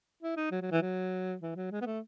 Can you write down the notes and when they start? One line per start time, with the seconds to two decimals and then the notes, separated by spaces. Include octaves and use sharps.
0.23 E4
0.37 D#4
0.51 F#3
0.62 F#3
0.72 E3
0.82 F#3
1.42 E3
1.56 F#3
1.71 G#3
1.82 B3
1.86 A3